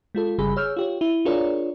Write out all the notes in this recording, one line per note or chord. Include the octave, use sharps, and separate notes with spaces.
G#3 F4 A4
G1 C#3 G3 G#4 B5
G#4 C#5 E6 F6 G6
F4 G4 C#5
E4
D4 F4 G#4 A#4 C#5 D5